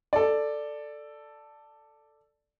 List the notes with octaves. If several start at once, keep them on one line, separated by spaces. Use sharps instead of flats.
A4 D5